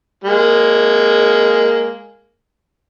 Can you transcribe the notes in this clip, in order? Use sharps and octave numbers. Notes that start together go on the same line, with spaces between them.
G#3 A#3